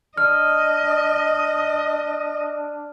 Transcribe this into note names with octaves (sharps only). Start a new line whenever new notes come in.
D4 D#5 F6